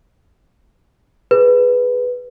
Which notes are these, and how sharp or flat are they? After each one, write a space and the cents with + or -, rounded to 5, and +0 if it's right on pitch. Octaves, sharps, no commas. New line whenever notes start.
G#4 +0 B4 +0